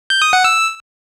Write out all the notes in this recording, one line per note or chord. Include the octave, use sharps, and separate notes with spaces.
G6
D#6
F#5
E6